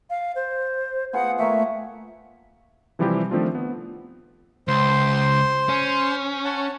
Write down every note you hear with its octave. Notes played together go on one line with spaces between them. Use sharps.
F5
C5
B3 F4 G#4 F#5
A3 A#3 C#5 E5
C3 E3 F3 G3 E4 G4
D#3 F3 A3 C4 D4 F4
B3
C#2 C5 C6
C#4
C#5 F#5 A5